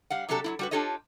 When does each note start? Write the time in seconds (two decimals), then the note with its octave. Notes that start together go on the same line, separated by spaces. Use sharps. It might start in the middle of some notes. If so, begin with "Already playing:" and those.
0.10 G3 F5 F#5
0.29 C3 F#3 D4 G4 A4 A5
0.44 F#3 A#3 E4
0.59 G3 F#4 B4
0.71 D4 F4 G4 A4 C#5 D#5